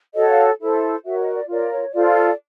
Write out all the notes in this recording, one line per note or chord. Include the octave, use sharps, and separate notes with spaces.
F#4 A4 C#5 D#5
F5
E4 A4 C5
F#4 A#4 C#5 E5
D#5
D5
F4 A#4 C#5 D5
C#5
F4 A4 C5 D5